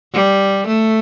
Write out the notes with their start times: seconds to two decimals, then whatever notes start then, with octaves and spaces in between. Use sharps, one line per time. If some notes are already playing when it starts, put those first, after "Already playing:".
0.14 G3
0.68 A3